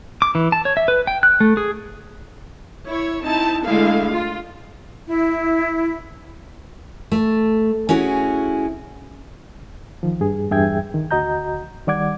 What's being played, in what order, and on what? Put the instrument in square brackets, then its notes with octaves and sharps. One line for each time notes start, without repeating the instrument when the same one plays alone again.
[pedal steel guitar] D6
E3
A5
C#5
E5
B4
G5
F#6
A3
G#4
[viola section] E4 C#5
C4 D#4 E4 A5
D3 G#3 A3 E4 F5
F4
[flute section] E4
[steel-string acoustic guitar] A3
C#4 E4 F#4 G#4
[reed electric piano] D#3 F3
G2 G#4
E2 G2 G#4 E5 G5 G#6
D#3
D2 F#4 D#5 A#5 G6
D#3 G3 D5 F#5 D6 G#6